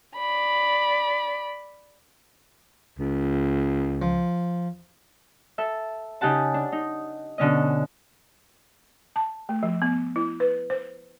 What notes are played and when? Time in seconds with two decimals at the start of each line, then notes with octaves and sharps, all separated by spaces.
0.17 D5 B5
2.99 C#2
4.02 F3
5.58 A4 E5
6.21 C#3 D#4 G4 F#5 A5
6.54 D4
6.72 D#4
7.38 B2 D3 C#4 D#5
9.16 A5
9.49 A3
9.63 F3
9.82 B3
10.16 E4
10.40 B4
10.70 C5